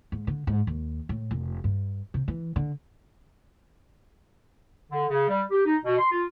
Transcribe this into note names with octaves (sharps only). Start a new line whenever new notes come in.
G#2
D3
G#2
D#2
A2
F1
G2
C3
E3
D3
D3
C#3
G3
G4
D#4
B2
C6
F4